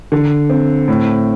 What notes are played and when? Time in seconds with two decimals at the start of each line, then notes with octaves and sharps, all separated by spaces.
0.12 D3
0.50 C4
0.88 A2